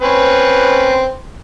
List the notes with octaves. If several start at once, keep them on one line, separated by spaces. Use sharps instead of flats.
C4 C#4 B4